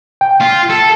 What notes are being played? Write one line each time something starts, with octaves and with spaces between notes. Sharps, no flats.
G5
F4
A4